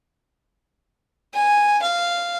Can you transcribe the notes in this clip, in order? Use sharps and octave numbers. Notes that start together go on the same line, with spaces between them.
G#5
F5